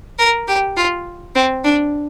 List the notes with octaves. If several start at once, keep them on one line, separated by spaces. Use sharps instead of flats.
A#4
G4
F4
C4
D4